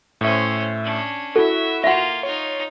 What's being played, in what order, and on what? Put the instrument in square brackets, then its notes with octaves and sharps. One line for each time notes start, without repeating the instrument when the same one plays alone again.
[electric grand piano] A2 E5 [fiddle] C#4 C5
[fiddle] C#4 D4
[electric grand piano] E4 F#4 [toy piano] A4 [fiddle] E5
[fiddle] A#3 F4 [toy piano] E5 F#5
[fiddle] D#4 F4 [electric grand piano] C#5